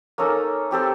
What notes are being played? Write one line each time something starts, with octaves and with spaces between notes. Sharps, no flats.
A#3 C#4 D#4 A4
C4 G4 A4 C5